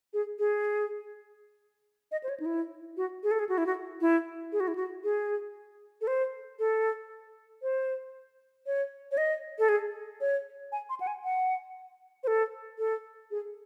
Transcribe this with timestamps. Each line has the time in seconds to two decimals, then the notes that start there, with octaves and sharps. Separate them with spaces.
0.13 G#4
0.39 G#4
2.12 D#5
2.24 C5
2.29 C#5
2.40 D#4
2.46 E4
2.97 F#4
3.23 G#4
3.31 A4
3.39 G#4
3.49 F#4
3.58 E4
3.67 F#4
4.01 E4
4.52 G#4
4.60 F#4
4.68 E4
4.75 F#4
5.04 G#4
6.01 A4
6.07 C5
6.59 A4
7.62 C5
8.66 C#5
9.12 C#5
9.17 D#5
9.59 A4
9.69 G#4
10.21 C#5
10.72 G#5
10.90 C6
11.00 F#5
11.07 G#5
11.24 F#5
12.23 C5
12.27 A4
12.78 A4
13.31 G#4